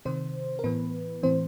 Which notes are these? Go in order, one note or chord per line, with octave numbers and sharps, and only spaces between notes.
C3 D#3 C4 C5
A#4
A2 E3 B3 B4
A2 E3 C4 C5